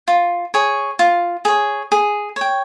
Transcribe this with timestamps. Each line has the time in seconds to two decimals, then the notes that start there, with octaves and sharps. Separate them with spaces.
0.08 F4
0.54 G#4 C#5
0.99 F4
1.45 G#4 C#5
1.92 G#4
2.36 C#5 G5